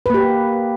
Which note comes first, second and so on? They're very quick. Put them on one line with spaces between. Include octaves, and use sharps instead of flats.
B4 A#3 G4